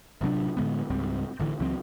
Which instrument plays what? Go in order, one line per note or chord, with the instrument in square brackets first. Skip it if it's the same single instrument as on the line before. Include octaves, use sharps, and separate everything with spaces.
[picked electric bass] A1 C3 F#3 D4
A2 D3 G#3 B3
C#2 G#2 G3 C4
A1 D3 E3
C#2 E3 F#3 C4